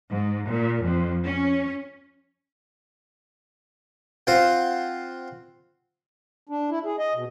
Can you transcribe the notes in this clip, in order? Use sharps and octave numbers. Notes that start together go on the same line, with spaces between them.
G#2
A#2
F2
C#4
C4 F4 C5 F#5
D4
E4
G#4
D#5
B2